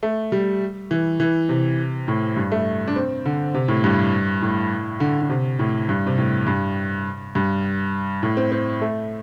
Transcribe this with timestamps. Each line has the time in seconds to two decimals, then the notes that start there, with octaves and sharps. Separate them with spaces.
0.03 A3
0.32 G3
0.91 E3
1.20 E3
1.49 C3
2.08 A2
2.36 G2
2.52 A3
2.87 D4
2.96 C4
3.25 D3
3.54 C3
3.68 A2
3.84 G2
4.42 A2
5.00 D3
5.21 D3
5.30 C3
5.59 A2
5.89 G2
6.06 C3
6.18 A2
6.47 G2
7.35 G2
8.23 A2
8.37 C4
8.52 C4
8.81 A3